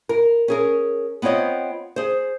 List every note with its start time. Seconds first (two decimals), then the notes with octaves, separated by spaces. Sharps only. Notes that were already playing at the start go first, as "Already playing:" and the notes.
0.09 A#4
0.48 C#4 G#4 A#4
1.22 B3 C4 F4 C#5 D#5
1.96 G#4 C5